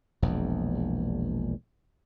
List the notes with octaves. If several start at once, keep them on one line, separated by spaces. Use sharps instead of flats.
E1 A#1 E2